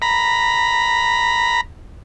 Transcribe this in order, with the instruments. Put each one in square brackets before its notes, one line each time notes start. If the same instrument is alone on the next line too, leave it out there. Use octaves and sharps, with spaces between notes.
[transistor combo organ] A#5 B5